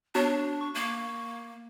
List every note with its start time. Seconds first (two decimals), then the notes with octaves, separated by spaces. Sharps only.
0.15 B3 D4 F#4 C#5
0.61 C#6
0.75 A#3